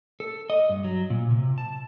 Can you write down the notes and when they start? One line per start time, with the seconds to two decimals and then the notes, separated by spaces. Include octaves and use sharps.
0.20 A4
0.50 D#5
0.69 G2
0.84 F#3
1.10 A#2
1.31 C3
1.58 A5